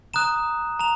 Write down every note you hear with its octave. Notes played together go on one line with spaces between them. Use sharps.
A#5 D#6 F#6 E7
A#5 F7